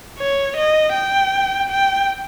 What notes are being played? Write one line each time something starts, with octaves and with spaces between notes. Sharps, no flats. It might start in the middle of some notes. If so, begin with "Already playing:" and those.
C#5
D#5
G5
G5